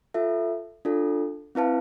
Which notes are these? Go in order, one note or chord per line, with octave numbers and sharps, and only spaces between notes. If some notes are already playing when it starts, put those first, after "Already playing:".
F4 A4 E5
D4 F4 A4
C4 E4 B4 F5 A5